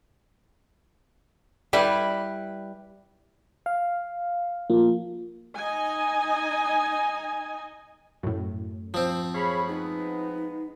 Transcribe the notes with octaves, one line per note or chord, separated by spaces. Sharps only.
G3 E4 B4
F5
F3 A#3
D#4 D#5 G#5
F#2 A2
F3 C4 C5
G#4 C#5 F5 B5
G#3 B3 D#4